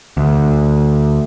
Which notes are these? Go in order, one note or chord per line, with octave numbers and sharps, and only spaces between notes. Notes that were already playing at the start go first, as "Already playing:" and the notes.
D2